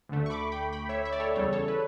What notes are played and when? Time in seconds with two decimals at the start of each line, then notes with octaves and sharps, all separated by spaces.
0.09 D2 D3 A3
0.26 C#6
0.30 B5 D6
0.52 G5 B5
0.73 G5 B5
0.89 C#5 E5
1.05 E5
1.12 D5
1.20 A4 C#5
1.36 E2 C#3 G3 A4 C#5
1.53 A4 C#5
1.68 B4